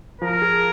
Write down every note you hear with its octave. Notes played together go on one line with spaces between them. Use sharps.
F3 A#4
G#4